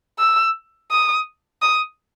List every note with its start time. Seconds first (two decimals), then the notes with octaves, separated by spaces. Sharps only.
0.19 E6
0.91 D#6
1.62 D#6